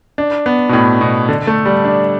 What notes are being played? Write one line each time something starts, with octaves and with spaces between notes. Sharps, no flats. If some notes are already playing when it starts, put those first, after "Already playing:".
D4
B3
B2
A2
B2
D3
A3
G3
D4